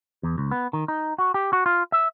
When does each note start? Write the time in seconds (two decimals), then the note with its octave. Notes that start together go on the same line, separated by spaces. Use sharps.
0.23 E2
0.38 C#2
0.51 B3
0.73 D#3
0.88 D#4
1.19 F#4
1.34 G4
1.53 F#4
1.66 F4
1.92 E5